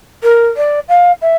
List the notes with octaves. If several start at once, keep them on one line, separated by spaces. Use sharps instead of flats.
A#4
D5
F5
E5